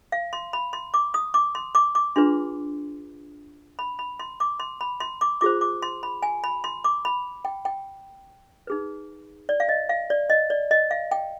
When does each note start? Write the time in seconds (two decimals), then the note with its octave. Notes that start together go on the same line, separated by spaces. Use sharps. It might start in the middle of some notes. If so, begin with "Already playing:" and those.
0.12 F5
0.33 C6
0.53 B5
0.73 C6
0.94 D6
1.14 D#6
1.34 D6
1.55 C6
1.75 D6
1.95 D6
2.16 D4 F4 G#4 B4 C6
3.79 B5
3.99 B5
4.19 C6
4.40 D6
4.60 C6
4.81 B5
5.00 C6
5.21 D6
5.41 F4 G#4 C5 D6
5.61 D6
5.82 C6
6.03 B5
6.23 G#5
6.44 B5
6.64 C6
6.84 D6
7.05 B5
7.45 G5
7.65 G5
8.67 D#4 G#4 B4
9.49 D5
9.60 F5
9.69 D#5
9.89 F5
10.10 D5
10.30 D#5
10.50 D5
10.71 D#5
10.91 F5
11.11 G5